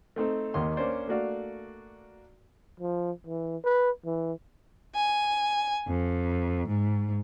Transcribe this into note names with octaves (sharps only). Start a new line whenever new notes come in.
A3 C4 D#4 A4
D#2 D#3 A#3 D#5 C6
A#3 C#4 D4 C5 D5
A3 A#3 D4 F#4 D5 F5
F3
E3
B4
E3
G#5
F2
G#2